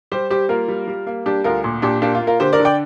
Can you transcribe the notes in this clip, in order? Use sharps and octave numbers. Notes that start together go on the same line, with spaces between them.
G3 G4 C5
G3 G4 C5
A#3 F4 A#4
G3
G3
A#3
G3 D4 G4
D2 F4 A#4
A#2
A#2 D4 G4
A#3 D4 G4
F4
A#3
F4 A#4
D3 G4 C5
A#4 D5
D3
D5 G5